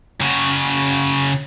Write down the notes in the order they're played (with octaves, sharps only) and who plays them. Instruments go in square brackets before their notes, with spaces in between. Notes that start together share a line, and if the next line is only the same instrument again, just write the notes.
[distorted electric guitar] C#3 F#4